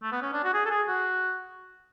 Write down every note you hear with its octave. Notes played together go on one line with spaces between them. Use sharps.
A3
B3
C#4
D4
F#4
G#4
A4
G#4
F#4